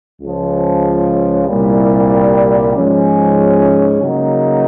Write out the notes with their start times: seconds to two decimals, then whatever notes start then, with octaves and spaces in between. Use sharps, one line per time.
0.20 C#2 C#3 F3
1.47 C2 A#2 G3
2.75 G#2 F3 G#3 C#4
4.01 C#3 F#3 A#3 D#4